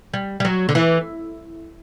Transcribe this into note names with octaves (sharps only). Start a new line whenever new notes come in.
G3
G3
F#3
D3
E3